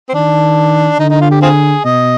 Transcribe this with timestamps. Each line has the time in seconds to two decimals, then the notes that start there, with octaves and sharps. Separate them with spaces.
0.09 C4
0.14 D#3 D4
0.99 D3 D#4
1.10 D#4
1.21 F4
1.31 G4
1.42 C4 F4 G#4
1.84 B2 D#5